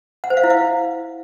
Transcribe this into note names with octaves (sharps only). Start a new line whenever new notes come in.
F#5
C5
F5
E4
F5